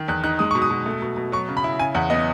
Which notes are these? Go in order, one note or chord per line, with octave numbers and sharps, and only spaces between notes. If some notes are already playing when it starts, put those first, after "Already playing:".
Already playing: D#3
E2 F#6
D#4 F#6
G#3 D#6
B2 C#6
D#6
B2
A3
B2
B2
F#3 C#6
C#3
B5
E4
C#3 G#5
E2 F#5
B3 D#5